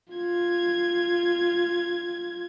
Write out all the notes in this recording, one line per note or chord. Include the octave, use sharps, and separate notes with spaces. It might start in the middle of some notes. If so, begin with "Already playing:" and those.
F4 G#6